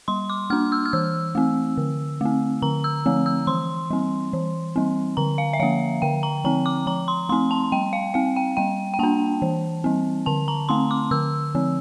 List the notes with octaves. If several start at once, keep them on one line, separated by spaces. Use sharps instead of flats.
G3 C6
D6
A#3 D4 F6
E6
F6
E3 E6
A3 C4
D3
A3 C4
D3 A#5
E6
F3 A3 C4
E6
E3 C6
G3 C4
E3
G3 C4
D3 A#5
F5
E5
F3 A#3 F5
D3 G5
A#5
F3 C4 A#5
D6
F3 A#5
C6
A3 C4 C6
A5
G3 G5
F5
C4 F5
G5
G3 G5
G5
A#3 D4 A5
E3
G3 C4
D3 A5
A#5
A3 C4 C6
D6
D3 E6
F3 C4